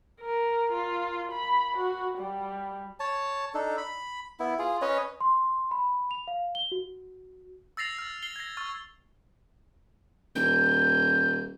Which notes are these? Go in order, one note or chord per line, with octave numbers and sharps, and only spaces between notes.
A#4
F4
B5
F#4
G3
C#5 A5
D4 D#4 A4
B5
B3 E4
F4 G#4
C#4 B4 C#5 D#5
C6
B5
F7
F5
G7
F#4
E6 A6 A#6 C7 F7
F6
C7 G7
G#6 A#6
C#6 F6 A6
D#1 G6